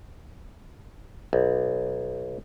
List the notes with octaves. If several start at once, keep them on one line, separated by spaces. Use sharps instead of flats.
B1